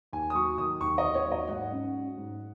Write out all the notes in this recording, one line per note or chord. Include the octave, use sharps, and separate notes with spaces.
D#2 G#5
D#6
F#3 C#6
D#3 D#6
D#2 C#6
D#5
D#2
C#5
F#3
D#5
G#2 F#5
C#4
F#3
G#2